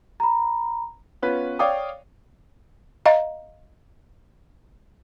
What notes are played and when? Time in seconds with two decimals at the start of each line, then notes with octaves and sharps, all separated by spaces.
0.20 A#5 B5
1.22 B3 C#4 F4 B4
1.59 C#5 D5 F5 G5 D6 D#6
3.06 D#5 F5 A#5